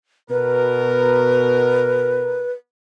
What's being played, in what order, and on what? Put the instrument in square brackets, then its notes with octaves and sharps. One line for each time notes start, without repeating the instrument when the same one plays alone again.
[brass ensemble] B2 A#4 [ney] B4